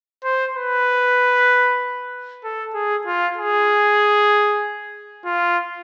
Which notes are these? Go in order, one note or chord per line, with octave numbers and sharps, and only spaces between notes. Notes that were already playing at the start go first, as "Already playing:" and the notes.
C5
B4
A4
G#4
F4
G#4
F4